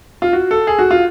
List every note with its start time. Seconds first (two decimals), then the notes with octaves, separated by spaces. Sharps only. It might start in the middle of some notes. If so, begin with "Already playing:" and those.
0.22 F4
0.33 F#4
0.51 A4
0.67 G#4
0.79 F#4
0.91 F4